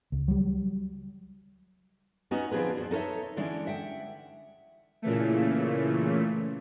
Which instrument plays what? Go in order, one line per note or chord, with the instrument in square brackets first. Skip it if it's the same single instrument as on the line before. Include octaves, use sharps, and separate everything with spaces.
[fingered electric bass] C#2
F#3 G3
[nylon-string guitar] B3 C#4 D#4 F#4 D#5
D3 F3 C4 D#4 G#4 B4
F2 B2
D#4 A4 A#4 C#5 E5
D3 E3 G#3 C#4 D4
E5 F#5 G5
[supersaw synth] A#2 C#3 E3 A3